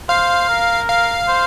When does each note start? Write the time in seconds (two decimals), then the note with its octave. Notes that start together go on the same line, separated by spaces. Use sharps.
0.09 C5 F5
0.49 A#4
0.89 F5
1.28 C5